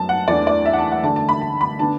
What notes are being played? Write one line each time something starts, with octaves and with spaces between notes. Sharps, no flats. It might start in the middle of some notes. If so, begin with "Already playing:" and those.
Already playing: F#2 F#3 B3 A5
F#5
E2 E3 A3 D4 D5
D5
E5
F#5
A5
F#5
D2 D3 A3 A5
A5
B5
A5
B5
D3 B3 D4 A5